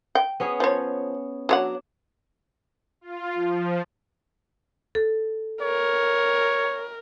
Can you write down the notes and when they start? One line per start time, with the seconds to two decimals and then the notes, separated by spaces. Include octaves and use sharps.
0.15 G5
0.40 B3 C#4 G#4
0.60 F3 C#5
1.49 F#3 D4 C#5 F#5
3.01 F4
3.35 F3
4.95 A4
5.62 A#4 C#5